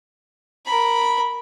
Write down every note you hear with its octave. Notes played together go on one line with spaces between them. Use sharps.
A#4 B5